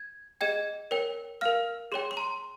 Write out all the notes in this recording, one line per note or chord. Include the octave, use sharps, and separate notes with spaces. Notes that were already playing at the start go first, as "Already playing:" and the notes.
Already playing: G#6
G#4 D#5 G5 G#6
A#4 C#5 G5
A#4 F5 F6
G#4 C#5 G5 C6
C6
A#5